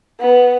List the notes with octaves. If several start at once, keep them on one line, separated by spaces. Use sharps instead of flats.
B3